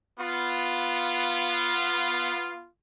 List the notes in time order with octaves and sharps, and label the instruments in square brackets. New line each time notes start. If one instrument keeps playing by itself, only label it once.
[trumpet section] B3 F4